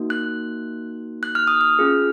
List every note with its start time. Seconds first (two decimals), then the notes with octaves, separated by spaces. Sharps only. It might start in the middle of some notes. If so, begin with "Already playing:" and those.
Already playing: A#3 D#4 F#4
0.10 F#6
1.23 F#6
1.35 F6
1.47 D#6
1.61 F6
1.79 C#4 F4 G#4